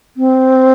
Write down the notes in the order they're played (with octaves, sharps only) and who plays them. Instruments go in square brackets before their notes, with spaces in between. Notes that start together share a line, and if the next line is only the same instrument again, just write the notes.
[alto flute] C4